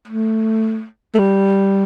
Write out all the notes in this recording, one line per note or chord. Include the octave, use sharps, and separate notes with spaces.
A3
A3
G3